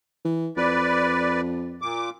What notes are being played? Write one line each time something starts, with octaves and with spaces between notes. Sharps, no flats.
E3
F2 B4 D5
A#2 D6